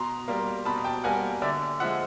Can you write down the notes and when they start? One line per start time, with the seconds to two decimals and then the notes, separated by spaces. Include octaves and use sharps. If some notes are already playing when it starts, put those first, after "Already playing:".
Already playing: B2 A#5 C6
0.28 G3 A#3
0.65 B2 A5 B5
0.84 G5 A5
1.04 G3 A#3 F#5 G#5
1.42 D3 D5 E5
1.80 F3 E5 F#5
1.84 G#3